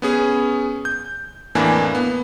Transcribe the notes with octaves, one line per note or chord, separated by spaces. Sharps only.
B3 C#4 G#4
G6
F2 A2 E3 A#3 D4 G#5
B3